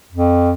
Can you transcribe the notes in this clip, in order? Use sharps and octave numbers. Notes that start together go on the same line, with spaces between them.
F2